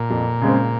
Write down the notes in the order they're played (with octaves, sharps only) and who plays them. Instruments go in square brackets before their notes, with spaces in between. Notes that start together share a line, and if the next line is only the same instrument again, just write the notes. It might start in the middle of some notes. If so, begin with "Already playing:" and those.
Already playing: [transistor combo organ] A#2
[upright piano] F2
C#3 G#3 C4